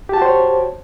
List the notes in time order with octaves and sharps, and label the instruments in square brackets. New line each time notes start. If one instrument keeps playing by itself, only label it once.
[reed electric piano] G4
A5
F#4
C5
C#5